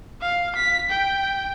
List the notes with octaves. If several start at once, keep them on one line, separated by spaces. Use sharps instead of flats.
F5
B6
G5